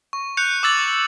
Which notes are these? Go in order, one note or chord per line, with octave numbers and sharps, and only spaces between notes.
C#6
F#6 G6 C#7 F7
D6 E6 A6 F#7